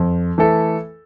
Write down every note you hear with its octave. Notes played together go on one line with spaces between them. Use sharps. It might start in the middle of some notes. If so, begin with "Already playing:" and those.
Already playing: F2
E3 A3 E4 A4